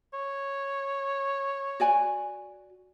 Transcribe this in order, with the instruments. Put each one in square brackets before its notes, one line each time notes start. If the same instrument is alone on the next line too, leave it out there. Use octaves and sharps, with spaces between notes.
[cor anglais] C#5
[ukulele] F#4 D5 G#5